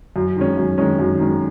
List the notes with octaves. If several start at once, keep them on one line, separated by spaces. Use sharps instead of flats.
F#2
D#3 G#3 C#4
F#2
D#3 G#3 C#4
F#2
D#3 G#3 C#4